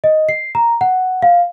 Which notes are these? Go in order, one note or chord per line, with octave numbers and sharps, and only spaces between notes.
D#5
C7
A#5
F#5
F5